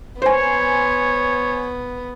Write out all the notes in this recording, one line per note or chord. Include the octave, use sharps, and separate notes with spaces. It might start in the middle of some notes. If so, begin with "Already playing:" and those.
B3 C5 C#5 G#5